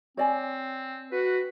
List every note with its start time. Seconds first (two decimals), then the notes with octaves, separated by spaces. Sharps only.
0.17 C4 C#5 D5 G#5
1.12 F#4 B4